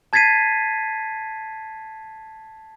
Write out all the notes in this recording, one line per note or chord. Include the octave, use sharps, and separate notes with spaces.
A5 G#6 A6 B6 C7 D#7